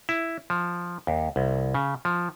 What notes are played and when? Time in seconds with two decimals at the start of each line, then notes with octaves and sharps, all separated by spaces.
0.09 E4
0.50 F3
1.07 D#2
1.36 C2
1.74 C#3
2.05 F3